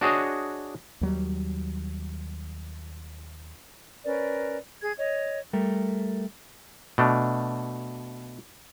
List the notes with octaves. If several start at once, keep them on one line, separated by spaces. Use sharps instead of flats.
D4 F#4 G#4 C#5 D#5
D#2 F#3 G3
C#4 A#4 B4 D5
G#4 G#6
C#5 D#5
G3 A3 A#4
B2 A3 D4